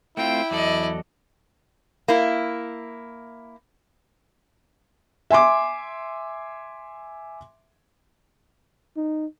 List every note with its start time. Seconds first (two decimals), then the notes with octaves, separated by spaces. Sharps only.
0.17 A3 C4 E4 F4 G5
0.51 E2 F#3 A4 D5 D#5
2.08 A#3 E4
5.30 E5 G#5 C6 D6
8.97 D#4